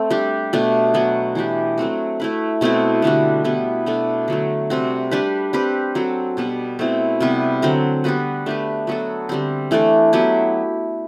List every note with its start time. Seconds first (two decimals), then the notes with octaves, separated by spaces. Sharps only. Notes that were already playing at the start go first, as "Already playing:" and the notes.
Already playing: A3 C4 A4
0.10 G3 D4 G4
0.53 B2 A3 D4
0.94 F#3 B3 F#4
1.35 E3 G3 D4 G4
1.78 F#3 A3 C4 F#4
2.20 A3 E4 B4
2.61 B2 A3 C4 E4
3.02 D3 G3 D4 F#4
3.45 G3 B3 E4
3.86 B2 A3 D4 A4
4.28 D3 F#3 A3
4.70 C3 G3 C4 F#4
5.11 G3 D4 G4 B4
5.53 G3 C4 G4 B4
5.95 F#3 C4 F#4 A4
6.37 B2 G3 B3
6.79 B2 A3 C4 E4
7.20 C3 G3 B3
7.62 D3 F#3 C4
8.04 G3 B3 F#4 B4
8.46 A3 D4 G4 B4
8.87 F#3 B3 F#4 A4
9.29 D3 G3 C4
9.71 E3 A3 D4 A4
10.13 F#3 B3 E4 G4